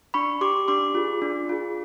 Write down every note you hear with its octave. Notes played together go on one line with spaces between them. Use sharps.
D4 B5 C#6
G4 C6 D6
D4 C6 D6
F4 G#4
D4
F4 G#4